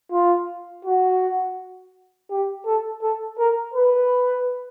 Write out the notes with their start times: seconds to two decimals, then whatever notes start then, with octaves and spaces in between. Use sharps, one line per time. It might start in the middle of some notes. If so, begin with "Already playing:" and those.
0.12 F4
0.85 F#4
2.30 G4
2.66 A4
3.02 A4
3.38 A#4
3.74 B4